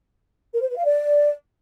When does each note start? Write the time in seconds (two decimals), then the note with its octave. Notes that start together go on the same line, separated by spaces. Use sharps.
0.54 A#4
0.61 C5
0.69 B4
0.77 F5
0.85 D5